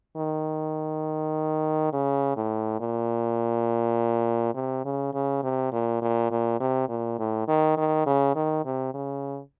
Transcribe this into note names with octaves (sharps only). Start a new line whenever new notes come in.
D#3
C#3
A2
A#2
C3
C#3
C#3
C3
A#2
A#2
A#2
C3
A#2
A2
D#3
D#3
C#3
D#3
C3
C#3